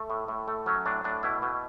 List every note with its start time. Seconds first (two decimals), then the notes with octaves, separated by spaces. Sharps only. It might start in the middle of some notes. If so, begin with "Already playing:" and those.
Already playing: A3
0.10 A2
0.28 A2
0.48 A3
0.66 F#3 C#4
0.86 A2 D4
1.04 A2 D4
1.23 B2 E4
1.42 B2